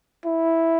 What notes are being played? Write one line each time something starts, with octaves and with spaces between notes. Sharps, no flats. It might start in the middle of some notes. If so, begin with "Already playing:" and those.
E4